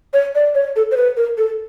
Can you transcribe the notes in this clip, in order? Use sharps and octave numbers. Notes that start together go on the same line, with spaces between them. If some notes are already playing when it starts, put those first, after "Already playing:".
C#5
D5
C#5
A4
C5
B4
A#4
A4